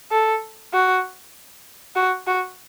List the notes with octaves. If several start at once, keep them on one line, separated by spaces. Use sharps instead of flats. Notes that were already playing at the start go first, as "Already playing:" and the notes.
A4
F#4
F#4
F#4